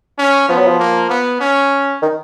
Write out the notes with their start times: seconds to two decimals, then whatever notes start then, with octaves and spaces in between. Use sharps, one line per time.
0.18 C#4
0.48 F3 B3
0.58 F#3
0.67 F3
0.79 A#3
1.10 B3
1.41 C#4
2.02 D#3